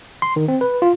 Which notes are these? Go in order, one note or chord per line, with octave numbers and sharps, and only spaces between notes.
C6
D#3
C4
B4
F4